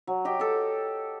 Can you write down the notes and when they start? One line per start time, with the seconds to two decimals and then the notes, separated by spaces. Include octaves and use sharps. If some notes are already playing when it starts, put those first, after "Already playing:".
0.07 F#3
0.25 G4 D#5 G5
0.40 A4 G5